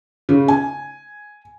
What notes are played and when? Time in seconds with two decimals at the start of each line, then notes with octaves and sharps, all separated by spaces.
0.29 C#3
0.48 G#5